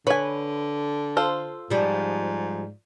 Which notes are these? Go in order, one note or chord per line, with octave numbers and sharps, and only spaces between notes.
D3 B4 C#5 G#5
F4 A4 C5
G#2 F3 G3